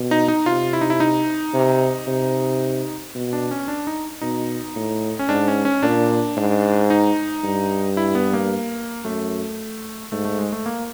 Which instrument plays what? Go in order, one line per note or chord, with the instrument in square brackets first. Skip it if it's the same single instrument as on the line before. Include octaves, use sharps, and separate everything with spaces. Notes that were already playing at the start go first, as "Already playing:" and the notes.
Already playing: [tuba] B2
[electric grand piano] D#4
D#4
[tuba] C3 [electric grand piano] F4
[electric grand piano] E4
D#4
E4
D#4
[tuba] C3
C3
B2
[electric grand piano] D4
C#4
D4
D#4
[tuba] B2 [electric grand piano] D#4
[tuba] A2
[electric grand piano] C#4
[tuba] G#2 [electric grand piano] D4
[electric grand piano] C#4
C#4
[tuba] A#2 [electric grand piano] D4
[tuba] G#2
[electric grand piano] D#4
[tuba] G2
[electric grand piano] E4
B3
A#3
[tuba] F#2 [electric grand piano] A3
[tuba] G#2 [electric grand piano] A3
[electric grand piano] A3
G#3
A3
A#3